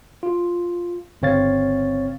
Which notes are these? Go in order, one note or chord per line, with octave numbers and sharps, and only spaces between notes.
F4
G1 C#3 C4 C#5 F5 A6